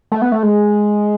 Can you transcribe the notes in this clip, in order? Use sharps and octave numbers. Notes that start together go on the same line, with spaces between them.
A3
B3
A3
G#3